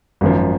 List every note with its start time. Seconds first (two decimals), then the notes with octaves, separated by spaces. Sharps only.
0.21 G#1 F#2 F3